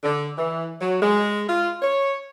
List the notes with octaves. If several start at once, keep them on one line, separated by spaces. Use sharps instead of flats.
D3
E3
F#3
G#3
F4
C#5